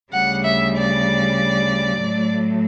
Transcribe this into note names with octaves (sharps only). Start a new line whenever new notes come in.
D2 C#3 G3 F#5
E5
D5
A2 F#3 A3